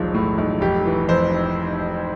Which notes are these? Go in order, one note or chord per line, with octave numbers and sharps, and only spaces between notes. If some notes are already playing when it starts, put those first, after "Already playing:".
Already playing: E1 B1 F3
A2
B1
F1 G4
E3
F2 C5